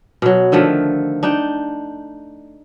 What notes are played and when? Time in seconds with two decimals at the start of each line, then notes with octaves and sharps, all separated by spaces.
0.22 B2 F#3
0.52 D3 D#3 F3 A3
1.23 D4 D#4 G5